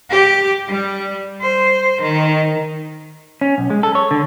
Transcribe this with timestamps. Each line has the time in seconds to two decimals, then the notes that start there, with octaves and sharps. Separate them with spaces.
0.10 G4
0.68 G3
1.41 C5
2.01 D#3
3.41 C#4
3.58 B1
3.70 G#3
3.83 A4
3.95 C#5
4.11 D3